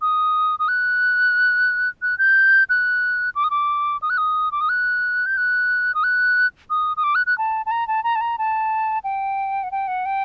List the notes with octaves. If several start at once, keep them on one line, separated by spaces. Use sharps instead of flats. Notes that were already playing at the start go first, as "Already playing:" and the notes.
D#6
D#6
F#6
F#6
G6
F#6
D6
D#6
D6
D#6
F#6
D#6
D6
D#6
F#6
G6
F#6
D#6
F#6
D#6
D#6
D6
F#6
F#6
A5
A5
A#5
A5
A#5
A5
A#5
A5
G5
F#5
G5
F#5
G5